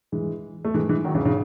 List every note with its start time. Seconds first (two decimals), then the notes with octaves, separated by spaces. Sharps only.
0.12 E3 G#3
0.65 A3
0.74 E3 G#3
0.89 E3 G#3
1.04 D#3 F#3
1.15 C#3 E3
1.25 C#3 E3